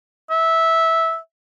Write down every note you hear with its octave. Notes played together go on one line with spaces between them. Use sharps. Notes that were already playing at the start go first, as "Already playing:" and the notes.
E5